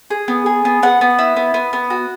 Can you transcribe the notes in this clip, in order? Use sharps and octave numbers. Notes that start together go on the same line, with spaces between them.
G#4
B3
G#4
B3
B3 F#5
B3
E4
B3
B3
B3
F#4